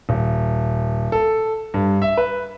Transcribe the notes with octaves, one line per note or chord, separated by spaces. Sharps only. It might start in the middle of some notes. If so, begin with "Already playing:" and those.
D#1
A4
G2
E5
B4